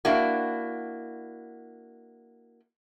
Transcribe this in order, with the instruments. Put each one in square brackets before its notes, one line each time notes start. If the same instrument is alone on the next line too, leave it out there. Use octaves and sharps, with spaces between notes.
[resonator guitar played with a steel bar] A#3 D4 E4 F#4